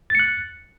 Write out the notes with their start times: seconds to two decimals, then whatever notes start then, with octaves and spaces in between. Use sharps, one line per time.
0.10 A6
0.15 C#7
0.19 F#6